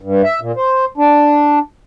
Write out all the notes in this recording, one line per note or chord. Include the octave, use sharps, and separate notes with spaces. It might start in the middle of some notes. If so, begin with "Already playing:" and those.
G2
E5
A#2
C5
D4